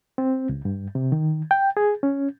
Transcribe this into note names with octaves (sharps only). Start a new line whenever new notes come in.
C4
C#2
G2
C3
D#3
G5
G#4
C#4